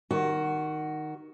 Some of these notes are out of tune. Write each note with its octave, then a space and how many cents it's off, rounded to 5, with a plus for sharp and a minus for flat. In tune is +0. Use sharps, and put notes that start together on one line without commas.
D#3 -5 F#4 +15